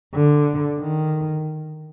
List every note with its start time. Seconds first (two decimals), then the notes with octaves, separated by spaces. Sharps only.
0.14 D3
0.80 D#3